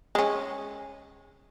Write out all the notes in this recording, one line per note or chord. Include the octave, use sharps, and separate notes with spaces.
G#3 C#4